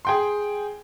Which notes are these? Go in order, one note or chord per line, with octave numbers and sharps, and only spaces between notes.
G#4 G5 C6